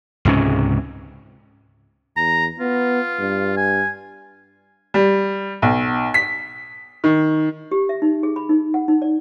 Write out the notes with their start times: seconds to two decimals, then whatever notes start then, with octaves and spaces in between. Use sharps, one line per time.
0.25 C#2 G#2 C3 C#4
2.17 E2 A#5
2.60 B3 F4
3.19 G2
3.57 G#5
4.94 G3
5.62 B1
6.14 B6
7.04 D#3
7.72 G4
7.89 E5
8.02 D#4
8.23 G#4
8.36 B5
8.49 D#4
8.74 F#5
8.88 D#4
9.02 D5